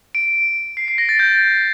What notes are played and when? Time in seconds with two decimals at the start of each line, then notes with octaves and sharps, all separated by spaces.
0.15 D7
0.77 C7
0.88 C7
0.98 A#6
1.09 A6
1.19 G6